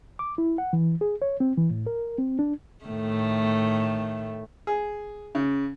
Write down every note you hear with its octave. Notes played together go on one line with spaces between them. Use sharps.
D6
E4
F#5
E3
G#4
C#5
C4
E3
A2
A#4
C4
D4
A2 D#3 A3
G#4
C#3